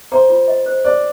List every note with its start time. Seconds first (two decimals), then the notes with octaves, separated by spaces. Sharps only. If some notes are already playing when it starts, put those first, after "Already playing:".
0.12 C5 A#5
0.30 F4
0.48 D#5
0.66 C5
0.84 C5 D5